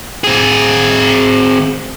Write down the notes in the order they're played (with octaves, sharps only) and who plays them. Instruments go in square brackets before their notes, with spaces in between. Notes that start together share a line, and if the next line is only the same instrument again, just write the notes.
[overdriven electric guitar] C4 G#4